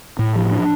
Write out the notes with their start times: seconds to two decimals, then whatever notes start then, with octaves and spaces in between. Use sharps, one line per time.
0.19 A2
0.36 F3
0.51 D4